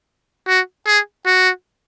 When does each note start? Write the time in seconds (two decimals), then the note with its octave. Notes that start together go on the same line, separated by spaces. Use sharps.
0.48 F#4
0.87 G#4
1.26 F#4